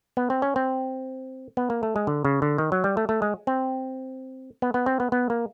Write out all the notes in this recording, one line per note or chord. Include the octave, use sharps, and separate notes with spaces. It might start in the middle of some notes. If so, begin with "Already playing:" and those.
B3
C4
C#4
C4
B3
A#3
A3
G#3
D3
C#3
D3
D#3
F#3
G3
A3
A3
G#3
C4
B3
B3
C4
B3
B3
A#3